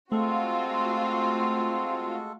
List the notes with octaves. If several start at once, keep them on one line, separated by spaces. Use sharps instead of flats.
G#3 A3 C4 F4 F#4 A4